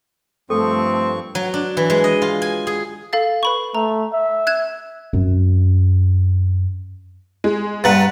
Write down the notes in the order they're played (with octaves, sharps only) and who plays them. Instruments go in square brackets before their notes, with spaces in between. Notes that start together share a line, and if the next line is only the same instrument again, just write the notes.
[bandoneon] G2 F3 C#6 [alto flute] A3 [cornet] C4 [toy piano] A4
[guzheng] F#3
D4
E3
G#3
D#5
F4
G#5
G#4
[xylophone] A4 F5 A6
B4 B5 C#6
[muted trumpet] A3 [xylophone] A#5
[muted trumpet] E5
[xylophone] F#6 G#6 E7
[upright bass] F#2 C4
[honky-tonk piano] G#3
[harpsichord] G2 B4 [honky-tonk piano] F#5 A#5 A6